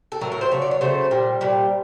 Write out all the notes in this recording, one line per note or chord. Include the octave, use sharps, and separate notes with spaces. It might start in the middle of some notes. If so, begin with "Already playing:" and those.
A4
A2 F#3 A3 A#4
A#4
C5
C#3 F#3 A3 C#5
D5
C#5
C#3 F#3 A3 C5
A#2 G3
A#2 G3